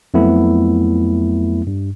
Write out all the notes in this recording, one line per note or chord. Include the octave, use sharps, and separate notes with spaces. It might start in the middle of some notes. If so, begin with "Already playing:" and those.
F2 F#3 A3 B3 E4
G2